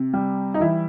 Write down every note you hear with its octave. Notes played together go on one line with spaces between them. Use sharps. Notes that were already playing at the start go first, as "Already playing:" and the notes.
Already playing: C3
G3
D#4
E3 E4